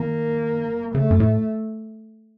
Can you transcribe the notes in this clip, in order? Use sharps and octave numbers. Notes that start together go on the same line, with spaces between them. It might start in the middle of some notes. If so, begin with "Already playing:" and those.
Already playing: D#3 A#3
C#3 A3
F#2
A2